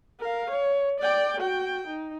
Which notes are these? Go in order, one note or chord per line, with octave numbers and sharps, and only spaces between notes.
A#4 F5
C#5
D5 G5
F#4 G5
D#4